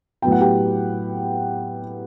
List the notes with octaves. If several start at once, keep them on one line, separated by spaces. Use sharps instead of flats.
A2 F#3 B3 G5
F#5
G4 G5